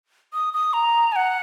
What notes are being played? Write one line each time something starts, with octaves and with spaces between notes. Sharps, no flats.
D#6
D#6
A#5
G#5
F#5